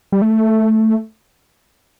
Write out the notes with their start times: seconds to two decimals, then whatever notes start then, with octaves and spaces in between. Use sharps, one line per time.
0.12 G3
0.22 A3